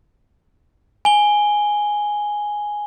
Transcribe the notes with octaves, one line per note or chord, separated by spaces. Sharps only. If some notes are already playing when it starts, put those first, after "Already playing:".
G#5 G7